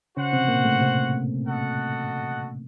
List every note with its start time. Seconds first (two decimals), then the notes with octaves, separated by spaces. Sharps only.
0.17 C#3 C#4 F#4 C5 F#5
0.33 C3 C4
0.48 A#2 A#3
0.65 A2 A3
0.81 C3 C4
1.46 F#4 A4 D#5 F#5